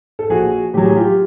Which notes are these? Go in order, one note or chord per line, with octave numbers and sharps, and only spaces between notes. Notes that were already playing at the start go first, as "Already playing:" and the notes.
A4
A#1 F#4 G#4
A2 F#3 G4
G#4
F4 G4